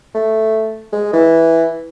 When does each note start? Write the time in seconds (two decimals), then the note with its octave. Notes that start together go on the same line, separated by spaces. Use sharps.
0.15 A3
0.92 G#3
1.13 E3